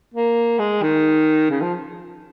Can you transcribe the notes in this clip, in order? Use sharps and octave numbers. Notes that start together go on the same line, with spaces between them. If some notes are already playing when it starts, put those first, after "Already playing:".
A#3
G#3
D#3
C#3
F3